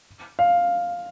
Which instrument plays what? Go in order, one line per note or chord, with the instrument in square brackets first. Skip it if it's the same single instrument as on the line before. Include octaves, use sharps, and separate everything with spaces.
[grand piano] F5